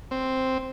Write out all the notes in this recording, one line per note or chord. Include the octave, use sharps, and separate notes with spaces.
C4